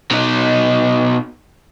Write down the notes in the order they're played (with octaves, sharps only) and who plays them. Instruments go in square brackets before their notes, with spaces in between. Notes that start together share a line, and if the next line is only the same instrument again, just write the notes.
[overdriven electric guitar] B2 D#4